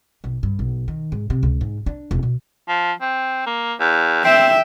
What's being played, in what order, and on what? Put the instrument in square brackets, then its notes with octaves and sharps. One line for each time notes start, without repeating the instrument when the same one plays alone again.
[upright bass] B1
G2
B1
D#3
G#2
C3
C#2
G#2
D4
E1
B2
[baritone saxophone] F3
C4
A#3
E2
[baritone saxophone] C4 [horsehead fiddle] E5 G5